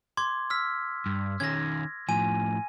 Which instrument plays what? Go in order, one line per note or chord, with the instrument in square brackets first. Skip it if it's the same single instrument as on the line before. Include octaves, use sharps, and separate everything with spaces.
[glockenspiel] C6 D6 G#6
E6 F6 B6
[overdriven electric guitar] G2
[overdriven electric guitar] D#3 C#4 [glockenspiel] G#6 A#6
[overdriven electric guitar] A2 F3 [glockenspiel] G#5 D#7